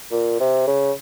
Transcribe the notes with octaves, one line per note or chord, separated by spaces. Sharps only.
A#2
C3
C#3